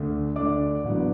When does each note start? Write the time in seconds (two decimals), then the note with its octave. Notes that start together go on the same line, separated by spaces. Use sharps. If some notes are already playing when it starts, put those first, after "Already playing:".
Already playing: D2 D3 A3 D4
0.36 D2 D3 A3 D4 D5 D6
0.84 A1 A2 F#3 B3 D4